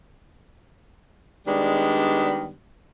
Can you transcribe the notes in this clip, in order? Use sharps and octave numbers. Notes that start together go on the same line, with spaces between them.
D#3 G3 G#3 B3 D4